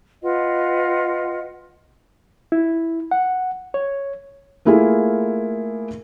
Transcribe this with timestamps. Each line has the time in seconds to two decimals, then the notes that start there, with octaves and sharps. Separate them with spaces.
0.23 F4 B4 D#5 F#5
2.52 E4
3.11 F#5
3.74 C#5
4.65 A3 A#3 E4 F4 G#4 A4